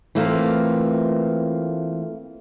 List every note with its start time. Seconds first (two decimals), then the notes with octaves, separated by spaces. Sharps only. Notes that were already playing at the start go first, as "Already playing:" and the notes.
0.15 E3 A3 A#3 C4 F4